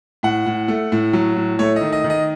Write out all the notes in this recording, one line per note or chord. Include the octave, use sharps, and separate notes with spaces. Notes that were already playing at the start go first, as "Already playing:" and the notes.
A2 F#5
A2
A3
A2
F#3
A2
A3 C#5
D#3 D#5
D#5
D#3
D#5